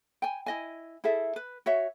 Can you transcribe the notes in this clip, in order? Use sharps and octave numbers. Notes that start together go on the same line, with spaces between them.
G5 G#5
E4 D#5 G#5
E4 G#4 A4 E5
B4
F#4 C#5 E5